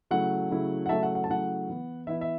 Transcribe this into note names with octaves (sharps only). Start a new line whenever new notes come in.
C#3 F#3 A3 E4 F#5
C#3 F#3 A3 E4
F#5
C#3 F#3 A3 E4 E5 A5
F#5
F#5
A5
C#3 F#3 A3 E4 F#5
E3 B3 E4
E3 B3 E4 E5
E5